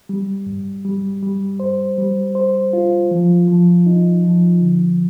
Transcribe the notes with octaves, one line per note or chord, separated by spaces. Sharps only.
G3
G2
G3
G3
C5
G3
C5
F4
F3
F3
D#4
F3
D3